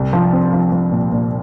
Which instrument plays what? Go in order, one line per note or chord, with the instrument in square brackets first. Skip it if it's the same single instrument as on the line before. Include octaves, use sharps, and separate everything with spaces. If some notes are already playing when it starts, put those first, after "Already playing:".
Already playing: [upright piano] C2
F3
C4
F3
F3
A#2
A#2